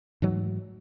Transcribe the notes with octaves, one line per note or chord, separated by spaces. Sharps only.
G#2 E3 F#3 A3